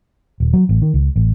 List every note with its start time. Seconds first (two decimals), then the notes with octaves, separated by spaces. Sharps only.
0.40 D#1
0.53 F#3
0.69 A1
0.82 D#3
0.94 C#2
1.16 A1